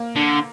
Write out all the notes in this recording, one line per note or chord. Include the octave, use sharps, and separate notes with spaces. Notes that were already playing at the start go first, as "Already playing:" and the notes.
Already playing: A#3
D3